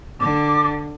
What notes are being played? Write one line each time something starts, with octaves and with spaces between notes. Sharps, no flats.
D3 D6